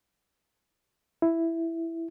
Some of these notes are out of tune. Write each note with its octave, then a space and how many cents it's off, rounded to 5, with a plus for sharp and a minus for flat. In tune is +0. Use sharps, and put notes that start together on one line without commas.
E4 +5